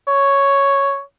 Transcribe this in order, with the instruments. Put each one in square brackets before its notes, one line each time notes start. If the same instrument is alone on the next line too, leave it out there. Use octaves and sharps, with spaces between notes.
[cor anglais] C#5